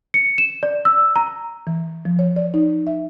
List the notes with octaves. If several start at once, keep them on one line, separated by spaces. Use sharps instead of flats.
C#7
E7
D5
E6
A#5
E3
F3
C#5
D5
D#4
E5